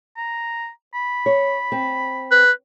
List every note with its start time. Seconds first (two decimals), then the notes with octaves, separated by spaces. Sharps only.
0.17 A#5
0.94 B5
1.26 C#5
1.72 C4
2.32 B4